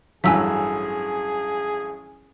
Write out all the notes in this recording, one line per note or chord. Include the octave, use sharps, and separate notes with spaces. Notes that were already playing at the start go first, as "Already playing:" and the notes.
A1 G2 F#3 G#4 G#5 E6 B6